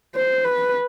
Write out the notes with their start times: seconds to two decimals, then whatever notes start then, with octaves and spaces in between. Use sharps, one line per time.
0.15 C5
0.44 B4